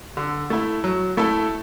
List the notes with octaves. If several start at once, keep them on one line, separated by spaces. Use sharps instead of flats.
D3
A3 E4
F#3
A3 E4 A4